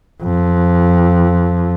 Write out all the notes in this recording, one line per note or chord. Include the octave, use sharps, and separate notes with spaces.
F2